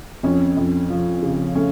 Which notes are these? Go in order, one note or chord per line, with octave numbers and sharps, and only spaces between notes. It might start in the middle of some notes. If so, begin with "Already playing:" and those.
F2 C#4
F2
F3
C#3
A3 C#4